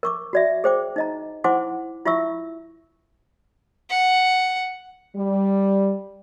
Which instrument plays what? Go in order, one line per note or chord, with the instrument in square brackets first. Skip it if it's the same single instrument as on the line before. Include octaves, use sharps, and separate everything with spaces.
[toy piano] A#4 C#6 D6
F#4 D5 E5
G#4 C5 G5 D6
D#4 D#5 A#5
E4 C5 F#5 G#5 C6 D6
E4 F4 E5 C#6 E6
[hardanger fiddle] F#5
[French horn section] G3